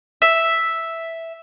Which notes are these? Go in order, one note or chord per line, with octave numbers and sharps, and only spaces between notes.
E5